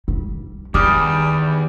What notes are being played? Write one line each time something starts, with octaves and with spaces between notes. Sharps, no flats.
G3
E2 D#3 G3 D6 D#6 F6